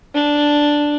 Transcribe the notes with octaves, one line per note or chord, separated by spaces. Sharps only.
D4